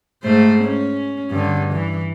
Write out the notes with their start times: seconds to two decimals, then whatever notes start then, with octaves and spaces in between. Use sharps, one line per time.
0.23 G#2 A3 C5
0.63 C#4
1.31 G2 D3
1.73 E3